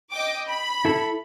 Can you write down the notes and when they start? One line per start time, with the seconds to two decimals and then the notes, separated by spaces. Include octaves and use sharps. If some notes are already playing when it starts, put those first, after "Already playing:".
0.12 D#5 G5 D6
0.48 B5
0.85 E4 A4